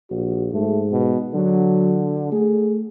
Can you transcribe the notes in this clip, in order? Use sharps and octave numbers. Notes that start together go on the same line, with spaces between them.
A#1 F#4
G#2 A3
B2
D3 F#3
A3 G#4